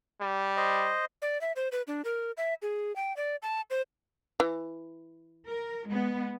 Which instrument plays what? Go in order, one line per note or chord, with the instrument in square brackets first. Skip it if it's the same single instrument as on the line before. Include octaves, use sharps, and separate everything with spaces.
[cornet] G3
[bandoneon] C5 D#5
[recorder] D5
E5
C5
B4
D4
A#4
E5
G#4
G5
D5
A5
C5
[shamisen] E3
[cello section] A#4
G#3 B3